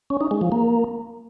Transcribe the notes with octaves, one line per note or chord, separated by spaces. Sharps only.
C#4
D#4
G#3
F3
A#3